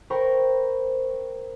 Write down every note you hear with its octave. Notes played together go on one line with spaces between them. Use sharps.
A#4 C5 G5 A#5 B5 C#6